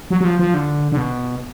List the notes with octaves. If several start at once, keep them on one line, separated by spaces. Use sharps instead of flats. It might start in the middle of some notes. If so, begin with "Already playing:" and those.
F#3
F#3
F3
F3
D3
D3
B2